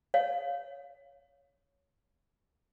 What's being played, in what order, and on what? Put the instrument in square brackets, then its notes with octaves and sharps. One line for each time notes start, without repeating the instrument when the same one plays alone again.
[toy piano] C#5 F5